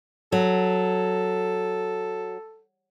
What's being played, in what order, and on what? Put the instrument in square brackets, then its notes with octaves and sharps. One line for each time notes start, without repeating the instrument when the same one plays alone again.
[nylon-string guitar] F#3 [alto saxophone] A4